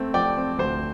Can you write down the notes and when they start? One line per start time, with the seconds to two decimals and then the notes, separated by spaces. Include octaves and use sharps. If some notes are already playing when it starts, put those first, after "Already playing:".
Already playing: A3 C4
0.14 F3 D5 G5
0.37 C4
0.58 D2 C5